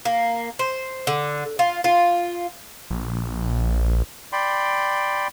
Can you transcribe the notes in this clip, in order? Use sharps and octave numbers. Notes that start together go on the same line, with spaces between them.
A#3
C5
D3
F4
F4
A#1
D5 G5 B5 C6